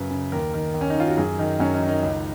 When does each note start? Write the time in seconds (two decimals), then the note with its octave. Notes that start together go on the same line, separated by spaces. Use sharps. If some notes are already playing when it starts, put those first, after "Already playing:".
Already playing: F#2 C#3 B4
0.11 C#3
0.32 D#2 A#4
0.54 D#3
0.74 D#2
0.81 C#4
0.90 D#4
0.97 D#3 F4
1.08 F#4
1.17 F#2 G#4
1.39 D#3 D#4
1.60 F#2 C#4
1.74 D#4
1.81 D#3
1.88 D#4
2.03 C#2